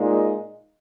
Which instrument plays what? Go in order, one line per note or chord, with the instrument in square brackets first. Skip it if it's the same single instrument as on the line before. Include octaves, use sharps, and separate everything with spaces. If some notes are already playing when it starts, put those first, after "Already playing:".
Already playing: [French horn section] A#2 G#3 D#4